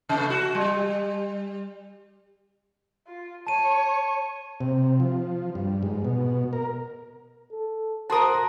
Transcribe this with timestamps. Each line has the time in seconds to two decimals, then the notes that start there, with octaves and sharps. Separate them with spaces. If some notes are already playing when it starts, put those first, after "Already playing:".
0.09 C3 B3
0.30 F#4
0.55 G3
3.07 F4
3.47 C#5 A5 D#7
4.60 C3
5.00 F3
5.55 G2
5.83 G#2
6.05 B2
6.53 A#4
7.52 A4
8.10 F#4 A#4 C5 A5 C6 D#6